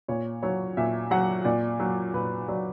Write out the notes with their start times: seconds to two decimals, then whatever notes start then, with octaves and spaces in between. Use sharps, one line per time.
0.08 A#2 C#5
0.43 F#3 C#5
0.77 A#2 E5
1.11 F#3 F#5
1.45 A#2 D5
1.80 F#3
2.14 A#2 B4
2.48 F#3 D5